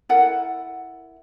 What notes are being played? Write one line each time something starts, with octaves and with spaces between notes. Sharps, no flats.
E4 A4 A#4 F#5